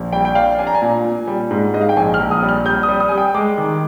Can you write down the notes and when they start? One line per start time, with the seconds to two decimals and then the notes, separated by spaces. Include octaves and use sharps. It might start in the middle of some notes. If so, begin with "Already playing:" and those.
Already playing: A#1
0.13 G3 G5
0.25 G5
0.35 D4 F5
0.58 D4 G#5
0.67 A#5
0.74 G#5
0.82 A#2
1.05 A#2
1.27 G3
1.51 G#2
1.74 G#2 D#5
1.81 F5
1.89 G5
1.96 A#1 G#5
2.14 F6
2.20 A#1
2.31 D#6
2.43 G3
2.49 F6
2.66 G3 G6
2.83 D#6
2.89 G3
3.00 D#6
3.09 G3 G#5
3.18 G5
3.34 G#3 D6
3.58 D#3